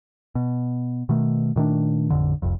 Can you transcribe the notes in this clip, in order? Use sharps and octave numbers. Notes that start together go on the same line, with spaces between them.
B2
B2 D#3 A3
A#2 D#3 A3 D4
A1 F2 D3
F1 C2 F2